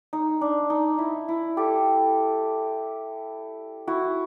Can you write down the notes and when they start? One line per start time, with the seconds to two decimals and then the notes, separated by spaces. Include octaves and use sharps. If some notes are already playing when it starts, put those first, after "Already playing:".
0.13 D#4
0.41 D4
0.70 D#4
0.98 E4
1.28 E4
1.57 G4 A4
3.87 E4 F#4